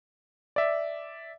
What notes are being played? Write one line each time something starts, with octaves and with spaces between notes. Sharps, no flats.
D5 E5